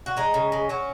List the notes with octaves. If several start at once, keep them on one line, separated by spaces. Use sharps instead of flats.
F#4
G#3 D#4
C#3
G#3
F#3 C#4